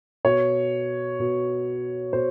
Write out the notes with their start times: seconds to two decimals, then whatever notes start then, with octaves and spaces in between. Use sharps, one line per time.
0.25 B2 C#5
1.20 B2
2.13 B2 C5